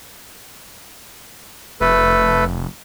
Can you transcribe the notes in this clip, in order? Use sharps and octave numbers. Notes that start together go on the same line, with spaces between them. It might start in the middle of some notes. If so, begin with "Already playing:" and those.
F1 A3 A4 B4